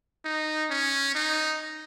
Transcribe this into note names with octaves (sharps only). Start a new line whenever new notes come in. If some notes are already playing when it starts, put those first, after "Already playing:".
D#4
C#4
D#4